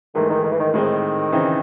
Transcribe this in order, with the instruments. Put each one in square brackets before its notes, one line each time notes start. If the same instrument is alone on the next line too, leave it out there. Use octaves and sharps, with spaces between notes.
[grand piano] G#2 E3 A3 [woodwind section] D#3
[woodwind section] D#3
D#3
E3
D#3
[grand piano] A2 G#3 C4 [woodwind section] D#3
[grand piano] C#3 E3 C4 D#4